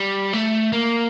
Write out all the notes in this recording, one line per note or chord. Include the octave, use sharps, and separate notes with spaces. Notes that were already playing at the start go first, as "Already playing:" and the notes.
Already playing: G3
A3
A#3